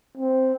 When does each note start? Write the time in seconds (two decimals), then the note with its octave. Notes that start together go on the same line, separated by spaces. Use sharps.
0.18 C4